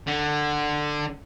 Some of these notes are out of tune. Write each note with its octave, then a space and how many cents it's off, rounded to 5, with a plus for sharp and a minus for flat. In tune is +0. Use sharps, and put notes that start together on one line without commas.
D3 +15